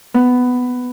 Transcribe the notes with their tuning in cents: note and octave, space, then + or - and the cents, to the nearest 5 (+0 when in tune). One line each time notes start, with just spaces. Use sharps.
B3 +10